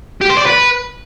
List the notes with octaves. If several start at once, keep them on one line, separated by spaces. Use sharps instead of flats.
G4
C5
D5
B4